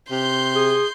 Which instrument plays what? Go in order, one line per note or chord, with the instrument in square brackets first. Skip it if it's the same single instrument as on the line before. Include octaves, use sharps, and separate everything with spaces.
[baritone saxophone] C3 [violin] C6 G6
[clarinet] G#4